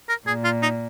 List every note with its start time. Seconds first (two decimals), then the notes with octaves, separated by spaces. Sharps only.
0.09 A#4
0.27 A#2 G#4
0.44 F4
0.62 D#4